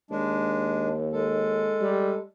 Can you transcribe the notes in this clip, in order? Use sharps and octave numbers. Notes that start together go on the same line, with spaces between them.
D#2 G#3 D4
G#3 A4
G3